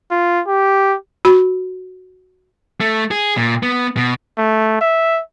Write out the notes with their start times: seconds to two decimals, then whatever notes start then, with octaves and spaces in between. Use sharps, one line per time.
0.11 F4
0.48 G4
1.25 F#4 B5
2.80 A3
3.11 G#4
3.37 A#2
3.63 B3
3.97 B2
4.38 A3
4.81 E5